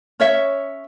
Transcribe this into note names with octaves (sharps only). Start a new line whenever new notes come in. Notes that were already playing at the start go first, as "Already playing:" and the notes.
C#4 C#5 E5